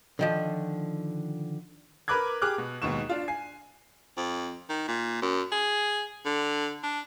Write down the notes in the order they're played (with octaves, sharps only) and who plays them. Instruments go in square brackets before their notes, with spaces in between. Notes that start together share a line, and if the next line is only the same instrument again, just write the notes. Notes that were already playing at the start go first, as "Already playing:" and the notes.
[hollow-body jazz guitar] D3 D#3 F3
[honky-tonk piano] A#4 B4 B5 D6 F#6 G#6
G4 G#4 D6 F6 F#6
B2
D#2 G#2 B2 C#6 E7
D4 F4
G#5 C7
[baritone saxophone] F2
D#3
A#2
F#2
G#4
D3
D4